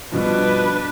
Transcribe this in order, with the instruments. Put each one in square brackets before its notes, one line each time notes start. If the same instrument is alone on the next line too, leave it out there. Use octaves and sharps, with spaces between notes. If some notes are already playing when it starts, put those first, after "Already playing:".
[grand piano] G2 B2 F3 [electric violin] D4 B4